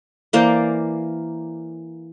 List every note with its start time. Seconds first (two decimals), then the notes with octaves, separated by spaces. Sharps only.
0.33 E3 A#3 C5 D5